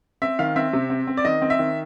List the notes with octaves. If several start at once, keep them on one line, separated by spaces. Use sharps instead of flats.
C4 E5
D#3 F5
C4 E5
C3
C4
C4
D5
D#3 D#5
C4
E5
D#3